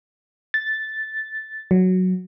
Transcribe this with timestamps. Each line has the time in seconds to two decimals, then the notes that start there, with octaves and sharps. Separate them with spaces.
0.54 A6
1.71 F#3